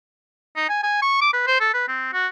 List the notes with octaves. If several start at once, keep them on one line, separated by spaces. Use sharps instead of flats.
D#4
G#5
G#5
C#6
D6
B4
C5
A4
B4
C4
F#4